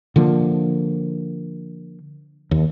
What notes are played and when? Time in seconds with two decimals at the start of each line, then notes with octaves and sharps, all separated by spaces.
0.16 D3 F3 A#3
2.51 D#2